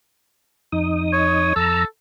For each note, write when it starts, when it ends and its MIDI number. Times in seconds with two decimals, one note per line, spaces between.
0.72 1.53 41
0.72 1.53 63
0.72 1.53 87
1.13 1.52 73
1.56 1.85 41
1.56 1.84 69
1.56 1.85 82
1.56 1.85 88